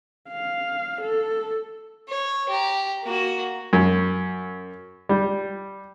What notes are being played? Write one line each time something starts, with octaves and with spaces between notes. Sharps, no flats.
F5
A4
C#5
G4 A#5
A#3 F#4
F#2
G3